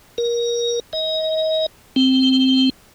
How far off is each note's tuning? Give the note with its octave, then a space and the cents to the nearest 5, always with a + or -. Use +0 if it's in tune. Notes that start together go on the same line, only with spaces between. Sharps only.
A#4 +20
D#5 +30
C4 +0